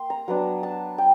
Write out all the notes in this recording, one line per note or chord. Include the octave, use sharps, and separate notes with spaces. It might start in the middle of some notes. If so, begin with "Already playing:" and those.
Already playing: A#3 G5 C6
A#5
F#3 B3 D4
A5
G5